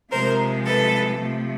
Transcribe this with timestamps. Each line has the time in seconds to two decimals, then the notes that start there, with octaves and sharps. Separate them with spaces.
0.11 C3 F3 G#3 A#4 C5
0.66 A4 B4
1.19 C3 F3 A3